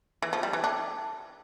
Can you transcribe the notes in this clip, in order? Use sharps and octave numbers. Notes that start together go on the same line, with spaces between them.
E3
F3
G3
E3
D4